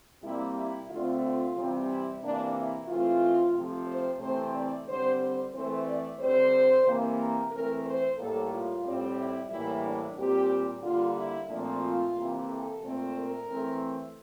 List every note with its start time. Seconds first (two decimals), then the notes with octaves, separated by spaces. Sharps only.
0.23 C3 G3 A#3 E4
0.56 E4
0.89 D3 A3 C4 F4
1.23 F4
1.56 C3 E3 G3 C4
1.88 E4
2.22 C3 E3 A#3 D4
2.56 E4
2.88 E3 A3 C4 F4
3.55 C3 F3 A3
3.87 C5
4.20 C3 E3 A3 C4 C5
4.54 D5
4.87 D3 G3 C4 C5
5.19 C5
5.52 E3 A3 C4 C5
5.86 D5
6.19 D3 G3 C4 C5
6.85 C3 E3 A#3
7.18 A#4
7.52 E3 A3 C4 A#4
7.85 C5
8.18 A2 G3 A#3 A4
8.51 F4
8.85 A2 G3 C4
9.18 E4
9.50 A2 E3 G3 A#3 E4
9.84 D4
10.17 A#2 G3 C4 G4
10.83 D3 G3 A#3 F4
11.16 E4
11.49 A#2 F3 A3 C4 D4
11.82 F4
12.16 C3 E3 A#3
12.48 A4
12.81 A#2 A3 C4
13.15 A#4
13.48 E3 A3 C4